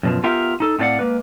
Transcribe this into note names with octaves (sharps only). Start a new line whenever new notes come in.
F#2 B2 F3
B3 F4 G4 A#4 E5 F5
D#4 A4
A2 A3 C4 D5 F5 F#5
G#3 A#3 B4